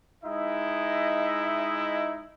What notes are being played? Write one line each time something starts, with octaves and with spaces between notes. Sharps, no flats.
G#3 D#4 E4 D#5 E5